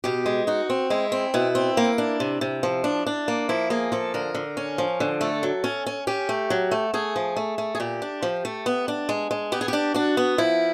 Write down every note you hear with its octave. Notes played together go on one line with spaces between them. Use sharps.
B2 G4
G#3
D#4 F#4
C4
G#3 E4
C4
B2 E4
C4
A#3
D4
C3
C3
F3
D4
D4
A#3
F3 E4
A#3 G#4
F3 A4
D3 A#4
D3
C#4
F3
D3
A3 A4
F#3
C#4
C#4
C#4 G4
A3
F#3
A3
A3 G#4
F3
A3
A3
G#4
A#2 G4
D4
F3
A3
B3
D4
G#3
G#3
B3 G4
G#4
D4 G4
D4 F#4
B3
F3 E4